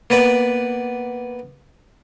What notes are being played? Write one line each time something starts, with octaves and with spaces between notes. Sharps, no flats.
A#3 B3 B4 D5